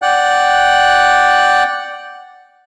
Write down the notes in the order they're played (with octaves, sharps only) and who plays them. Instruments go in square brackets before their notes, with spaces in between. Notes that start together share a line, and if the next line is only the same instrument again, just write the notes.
[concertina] D5 F#5 G5 F#6